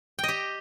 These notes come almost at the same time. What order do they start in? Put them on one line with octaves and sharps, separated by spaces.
G5 D#5 G4